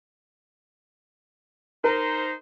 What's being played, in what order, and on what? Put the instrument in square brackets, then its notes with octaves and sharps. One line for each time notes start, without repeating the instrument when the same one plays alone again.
[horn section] D#4 C5 A#5 [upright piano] A#4